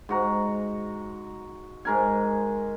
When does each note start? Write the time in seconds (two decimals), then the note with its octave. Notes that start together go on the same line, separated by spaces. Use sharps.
0.09 G#2 F#4 A#5
1.85 G#2 A#4 G#5